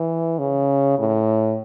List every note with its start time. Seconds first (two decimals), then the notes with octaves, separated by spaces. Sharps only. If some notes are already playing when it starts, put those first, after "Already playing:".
Already playing: E3
0.39 C#3
0.99 A2